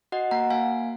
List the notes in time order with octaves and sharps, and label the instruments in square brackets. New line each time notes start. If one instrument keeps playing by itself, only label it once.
[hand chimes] F#4 D#5 F#5
A#3 F#5 A#5
A#3 F5 G#5